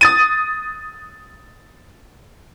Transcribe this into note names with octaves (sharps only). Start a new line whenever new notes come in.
D#6 A6 D#7